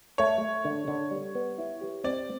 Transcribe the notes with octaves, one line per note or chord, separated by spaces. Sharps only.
A3 C#5
A3
D3
D3
G3
B3
E4
G4
C4 D5